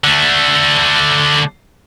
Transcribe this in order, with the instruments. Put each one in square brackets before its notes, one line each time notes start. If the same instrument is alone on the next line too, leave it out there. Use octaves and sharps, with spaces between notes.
[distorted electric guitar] D3 A3